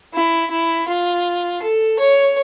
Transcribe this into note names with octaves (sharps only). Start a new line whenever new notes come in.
E4
E4
F4
A4
C#5